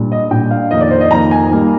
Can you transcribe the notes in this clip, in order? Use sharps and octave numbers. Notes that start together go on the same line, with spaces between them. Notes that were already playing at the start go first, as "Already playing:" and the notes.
Already playing: A#2 G3 D4
D#5
A#2 G3 D4 G5
F5
F2 D#3 A#3 D#5
D5
C5
D#5
F2 D#3 A#3 A#5
G#5
G3 A#3 D#4